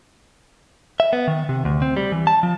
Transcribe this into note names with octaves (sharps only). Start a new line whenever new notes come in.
E5
B3
D#3
C3
D2
C4
G3
E3
A5
F3